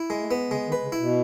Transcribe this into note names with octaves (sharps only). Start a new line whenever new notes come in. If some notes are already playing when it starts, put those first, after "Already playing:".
Already playing: E4
G#3
A3
B3
C#3 G#3
D#3
B4
C#3
E4
B2